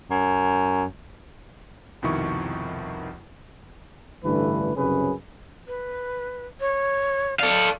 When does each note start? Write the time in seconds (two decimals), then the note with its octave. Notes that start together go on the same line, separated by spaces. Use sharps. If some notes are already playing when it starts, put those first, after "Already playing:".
0.10 F#2
2.02 C2 F2 B2 D#3 E4 C#6
4.24 A1 G2 D3 E3 A3 B4
4.76 C2 F#2 C#3 C#4 G#4 B4
5.68 B4
6.60 C#5
7.39 A4 D5 F5